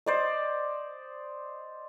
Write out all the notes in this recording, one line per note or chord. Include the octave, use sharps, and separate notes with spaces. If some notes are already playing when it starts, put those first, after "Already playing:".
C5 D5 D#5